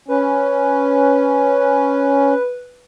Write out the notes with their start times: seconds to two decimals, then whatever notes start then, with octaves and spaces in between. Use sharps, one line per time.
0.08 C#4 B4